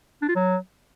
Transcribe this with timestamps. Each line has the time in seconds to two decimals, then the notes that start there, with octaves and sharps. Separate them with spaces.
0.22 D4
0.29 F4
0.36 F#3